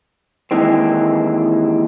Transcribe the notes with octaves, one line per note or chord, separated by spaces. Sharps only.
D#2 E3 G#3 C4